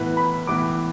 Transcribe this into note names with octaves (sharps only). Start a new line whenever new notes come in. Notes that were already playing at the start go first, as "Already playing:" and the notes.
Already playing: A2 E3 B3 B4
B5
A2 E3 B3 D6